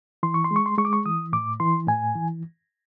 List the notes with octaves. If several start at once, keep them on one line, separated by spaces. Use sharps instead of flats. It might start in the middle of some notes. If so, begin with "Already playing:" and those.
E3 C6
C#6
C6
G#3
C#6
C6
G#3 C#6
D6
C#6
E3 D#6
A2 D6
E3 C6
A2 G#5
E3